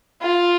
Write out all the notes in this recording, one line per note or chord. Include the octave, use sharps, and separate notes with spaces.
F4